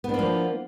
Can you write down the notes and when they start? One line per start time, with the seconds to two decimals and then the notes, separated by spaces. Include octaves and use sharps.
0.04 B3
0.09 D4
0.14 A#3
0.19 F3